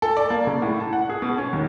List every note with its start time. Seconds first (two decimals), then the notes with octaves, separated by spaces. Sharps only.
0.02 A4
0.17 D5
0.30 A#3
0.47 C#3
0.62 A2
0.80 A5
0.93 F#5
1.10 G#4
1.22 B2
1.38 C#4
1.53 D#2